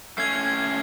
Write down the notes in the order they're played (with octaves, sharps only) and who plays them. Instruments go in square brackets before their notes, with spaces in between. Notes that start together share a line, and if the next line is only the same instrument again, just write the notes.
[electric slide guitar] A3 C#4 [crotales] G#6 C7